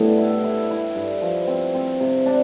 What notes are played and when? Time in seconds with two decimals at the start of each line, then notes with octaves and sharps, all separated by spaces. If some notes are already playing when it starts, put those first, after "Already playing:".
Already playing: A2 G3 B3 D4 A4
0.18 E4
0.44 E4
0.71 E4
0.96 G2
1.22 F3
1.47 C4
1.75 C4
2.00 C3
2.26 D4